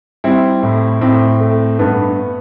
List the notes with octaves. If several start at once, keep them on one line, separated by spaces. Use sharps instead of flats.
G3 C4 E4
A2
A2 C4
A3
G2 B3